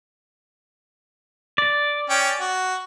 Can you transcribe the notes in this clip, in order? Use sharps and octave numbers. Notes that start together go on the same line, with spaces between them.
D5
C#4 G5
F#4